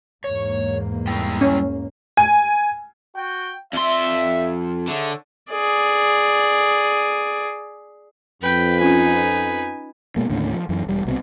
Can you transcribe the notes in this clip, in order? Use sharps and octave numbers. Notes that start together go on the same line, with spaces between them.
E2 G#2 A#3 C#5
G3 E4 G5
C#4
G#5
F#4 G5
F2 D5 E5 C6
D3 G#4 C#5 E5
G#4 D5
F2 B4 G5
C#4 D#4 F4 G#5
B2 G#3 A#3
D#2 A2 D3 C#4
F3
F#2 E3
E1 G3
C2 B2 G#3 C4